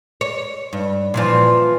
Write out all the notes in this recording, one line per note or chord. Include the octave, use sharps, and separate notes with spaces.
C#5
G2
A#2 E3 F3